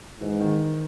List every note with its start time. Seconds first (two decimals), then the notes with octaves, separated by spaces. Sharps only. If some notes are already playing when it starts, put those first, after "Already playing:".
0.20 G#2 E3
0.40 D#3